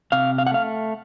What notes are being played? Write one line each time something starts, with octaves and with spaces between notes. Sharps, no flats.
C3 F5
F5
F#5
A3 F5